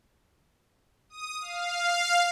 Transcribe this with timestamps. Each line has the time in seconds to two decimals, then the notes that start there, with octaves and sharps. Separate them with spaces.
1.10 D#6
1.41 F5